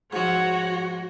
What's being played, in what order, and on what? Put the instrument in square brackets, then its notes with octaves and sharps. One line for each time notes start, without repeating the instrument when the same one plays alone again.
[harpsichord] G#2 F3 [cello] F#4 [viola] C#5 F#5